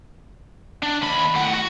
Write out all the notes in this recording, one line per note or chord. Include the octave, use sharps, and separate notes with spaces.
D4
D#2 B5
A2 F#5
F#4